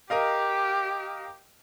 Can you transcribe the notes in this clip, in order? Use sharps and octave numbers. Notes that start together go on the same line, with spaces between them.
G4 A#4 D#5 F5